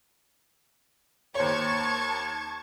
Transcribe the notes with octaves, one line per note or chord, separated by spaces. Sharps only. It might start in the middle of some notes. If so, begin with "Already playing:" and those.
D#2 C5 C#5 A5 C#6 G#6